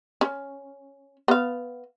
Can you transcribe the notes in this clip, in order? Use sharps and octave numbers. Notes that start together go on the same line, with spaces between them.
C#4
B3 F5